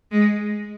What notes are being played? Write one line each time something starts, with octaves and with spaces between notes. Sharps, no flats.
G#3